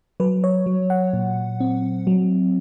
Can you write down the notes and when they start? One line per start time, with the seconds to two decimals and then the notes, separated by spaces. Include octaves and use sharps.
0.20 F#3 B4
0.44 C#5
0.66 F#3
0.90 F#5
1.13 A#2
1.60 C4
2.07 F#3